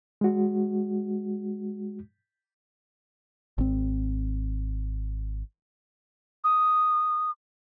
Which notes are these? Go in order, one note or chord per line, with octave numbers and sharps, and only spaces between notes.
G#3 F#4
G#1 C4
D#6